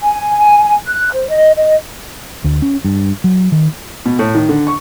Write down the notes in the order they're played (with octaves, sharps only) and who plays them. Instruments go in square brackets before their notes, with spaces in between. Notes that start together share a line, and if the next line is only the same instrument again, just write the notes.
[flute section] G#5
F#6
C5
D#5
D#5
[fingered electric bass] D2
C#4
G2
F#3
D#3
[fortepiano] B2
A2
D#3
D3
C#6